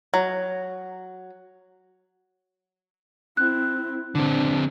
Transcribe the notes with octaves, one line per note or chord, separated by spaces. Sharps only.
F#3
C4 E4 F#6
D3 C4 D4